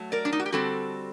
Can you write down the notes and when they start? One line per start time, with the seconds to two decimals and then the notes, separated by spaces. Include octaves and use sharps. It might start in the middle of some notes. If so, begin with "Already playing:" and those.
Already playing: F#3 A3
0.12 A#4 D5
0.25 D4
0.32 D#4
0.40 F#4
0.46 G4
0.52 D3 G3 C4 F#4 A4